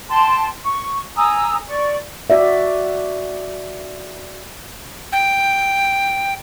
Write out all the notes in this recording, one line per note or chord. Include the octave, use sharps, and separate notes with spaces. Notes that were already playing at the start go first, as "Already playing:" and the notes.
G5 A5 C6
C#6
G#5 A#5 D#6 E6
D5 C#6
F#4 D5 E5
G5